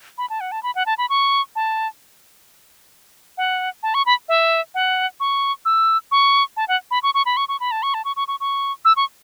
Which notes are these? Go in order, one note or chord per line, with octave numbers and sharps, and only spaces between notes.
B5
A5
F#5
A5
B5
F#5
A5
B5
C#6
A5
F#5
A5
C#6
B5
E5
F#5
C#6
E6
C#6
A5
F#5
B5
C#6
C#6
B5
C#6
C#6
B5
A5
C#6
A5
C#6
C#6
C#6
C#6
E6
C#6